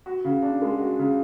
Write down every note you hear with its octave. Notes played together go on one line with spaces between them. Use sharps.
F#4
C#3
D4
G#3
F#4
C#3